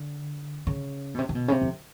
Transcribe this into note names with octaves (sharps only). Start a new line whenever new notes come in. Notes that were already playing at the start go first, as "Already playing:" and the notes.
Already playing: D3
C#3
B2
C3
C3
B2
C#3
C3
F2